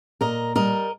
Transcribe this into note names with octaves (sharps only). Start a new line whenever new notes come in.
A#2 A#4 D#5
G3 A#4 D#5